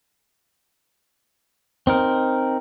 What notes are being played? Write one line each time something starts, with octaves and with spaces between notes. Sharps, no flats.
C4 D#4 A#4